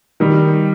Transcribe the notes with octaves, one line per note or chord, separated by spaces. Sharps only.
D#3 G3